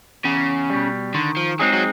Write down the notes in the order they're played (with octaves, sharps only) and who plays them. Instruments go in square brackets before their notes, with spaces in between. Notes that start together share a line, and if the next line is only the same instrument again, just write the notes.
[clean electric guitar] E2 [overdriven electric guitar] C#3
[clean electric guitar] B2 G3
[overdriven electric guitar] D3 [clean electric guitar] D#3
[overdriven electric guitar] F3
[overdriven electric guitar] F#3 [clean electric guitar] G#3 C4 D#4 G#4
[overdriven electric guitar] F#3